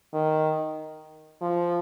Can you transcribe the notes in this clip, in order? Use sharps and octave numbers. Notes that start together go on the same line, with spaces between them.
D#3
F3